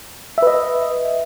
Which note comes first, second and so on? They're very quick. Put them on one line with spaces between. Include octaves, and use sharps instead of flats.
E5 B4 D#5